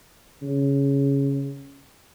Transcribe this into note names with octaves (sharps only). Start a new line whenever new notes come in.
C#3